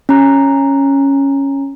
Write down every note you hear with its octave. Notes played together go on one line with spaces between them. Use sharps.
C#4 A#5